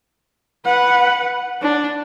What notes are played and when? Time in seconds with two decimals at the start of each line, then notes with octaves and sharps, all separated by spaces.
0.65 B4 F#5
1.62 D4